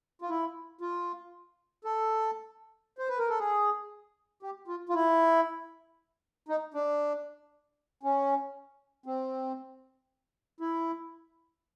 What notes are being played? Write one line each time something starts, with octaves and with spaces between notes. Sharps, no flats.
F4
E4
F4
A4
C5
B4
A#4
A4
G#4
G4
F4
F4
E4
D#4
D4
C#4
C4
E4